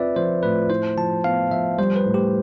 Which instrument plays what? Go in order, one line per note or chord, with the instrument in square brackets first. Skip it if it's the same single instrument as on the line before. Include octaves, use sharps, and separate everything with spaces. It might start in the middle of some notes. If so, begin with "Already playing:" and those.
Already playing: [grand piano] C4 F4 [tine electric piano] B4 D5 E5
[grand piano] F3 [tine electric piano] C5
[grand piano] A2 [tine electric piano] B4
[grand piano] E4 [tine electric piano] C5
[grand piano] F3 [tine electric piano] A5
[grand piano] B3 [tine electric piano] F5
[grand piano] F3 [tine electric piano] E5
[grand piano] G3 [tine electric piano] C5
[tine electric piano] B4
[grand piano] A2
[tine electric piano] G4